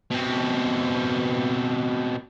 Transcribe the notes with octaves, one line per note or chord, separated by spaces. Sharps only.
B2 C4